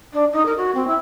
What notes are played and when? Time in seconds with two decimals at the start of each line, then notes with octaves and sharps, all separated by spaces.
0.13 D4
0.32 D#4
0.45 A#4
0.57 F#4
0.74 C4
0.87 E4